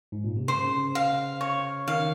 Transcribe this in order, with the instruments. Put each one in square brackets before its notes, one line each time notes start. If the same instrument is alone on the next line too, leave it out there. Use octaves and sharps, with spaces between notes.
[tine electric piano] G#2
A#2
C3
[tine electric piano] C#3 [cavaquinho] C5
[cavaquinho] F5
C#5
[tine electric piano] D#3 [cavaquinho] F5